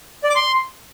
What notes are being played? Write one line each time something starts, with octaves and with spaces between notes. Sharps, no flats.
D5
D6
C6